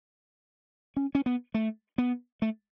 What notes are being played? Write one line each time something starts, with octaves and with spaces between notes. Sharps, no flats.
C#4
C#4
B3
A3
B3
A3